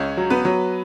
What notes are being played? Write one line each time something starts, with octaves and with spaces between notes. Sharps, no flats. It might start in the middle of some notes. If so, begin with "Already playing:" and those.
Already playing: C#2 C#4 C#5
F#3
B3 B4
F#3